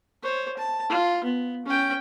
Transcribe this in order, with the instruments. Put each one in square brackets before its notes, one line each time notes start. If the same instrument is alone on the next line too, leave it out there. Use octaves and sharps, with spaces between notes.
[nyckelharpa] C5 C#5
A5
F4
B3
C#4 G5